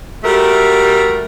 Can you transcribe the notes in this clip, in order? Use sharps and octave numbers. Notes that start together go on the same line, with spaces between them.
G3 A3 F#4 A#4